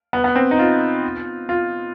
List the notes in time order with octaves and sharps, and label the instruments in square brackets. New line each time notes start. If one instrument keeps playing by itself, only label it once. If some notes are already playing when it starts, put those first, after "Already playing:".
[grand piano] B3
B3
C4
D#4
F4
F4